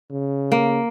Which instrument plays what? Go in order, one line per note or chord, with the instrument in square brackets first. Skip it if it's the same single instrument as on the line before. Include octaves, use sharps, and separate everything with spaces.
[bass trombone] C#3
[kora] A#3